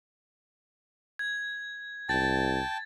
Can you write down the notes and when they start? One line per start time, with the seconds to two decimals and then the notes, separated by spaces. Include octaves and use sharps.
1.19 G#6
2.09 C2 G5 A5 A6